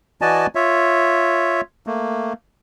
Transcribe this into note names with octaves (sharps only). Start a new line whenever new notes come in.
E3 F#4 D5 D#5 G#5 A5
F4 C#5 E5
A3 A#3